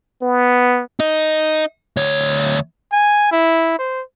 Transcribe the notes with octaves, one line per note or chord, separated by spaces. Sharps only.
B3
D#4 D#5
D2 C#5
G#5
E4
C5